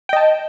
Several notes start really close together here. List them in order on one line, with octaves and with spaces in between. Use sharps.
G5 D#5 A5